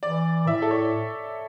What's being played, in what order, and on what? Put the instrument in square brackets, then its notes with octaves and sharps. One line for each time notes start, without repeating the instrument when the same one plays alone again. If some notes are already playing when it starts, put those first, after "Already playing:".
[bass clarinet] E3 [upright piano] D5
[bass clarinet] A2 [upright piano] E5
[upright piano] A4
C#5